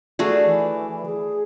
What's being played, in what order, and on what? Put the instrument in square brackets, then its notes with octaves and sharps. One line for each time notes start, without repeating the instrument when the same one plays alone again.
[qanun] A3 F#4 G#4 [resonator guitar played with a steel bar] D4
[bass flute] E3
G#4